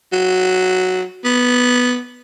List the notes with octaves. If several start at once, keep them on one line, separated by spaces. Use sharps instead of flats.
F#3
B3